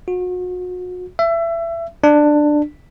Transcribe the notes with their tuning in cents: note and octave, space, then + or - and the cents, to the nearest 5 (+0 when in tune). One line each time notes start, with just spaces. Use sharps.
F#4 -35
E5 +25
D4 +15